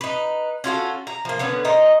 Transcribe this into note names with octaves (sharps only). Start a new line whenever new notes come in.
D#4 B4
C#4 F4 F#4 A4
A#5
F3 A#3
D3 B3 C#4 B4
D#4 A#4 C5 D#5